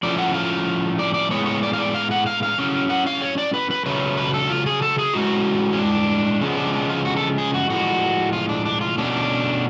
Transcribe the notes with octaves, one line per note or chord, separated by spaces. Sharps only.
A2 F3 A3 C#4 D5
F#5
F5
D5
D5
A2 G#3 B3 C#5
C#5
D5
F5
D5
F5
F#5
F5
F5
A2 F#3 C#4
F#5
F5
C#5
D5
B4
B4
C#3 F#3 A3 C#4 B4
B4
A4
F4
G#4
A4
G#4
A2 G#3 C#4 F#4
C#4
D4
C#3 F3 G#3 B3 C#4
D4
D4
F4
F#4
A4
G#4
F#4
A2 F3 G#3 F#4
F4
D4
D4
F4
B2 A3 C#4 D4